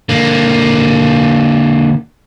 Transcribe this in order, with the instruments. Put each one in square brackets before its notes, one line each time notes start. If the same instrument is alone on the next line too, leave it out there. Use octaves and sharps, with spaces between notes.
[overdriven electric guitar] D3 A#3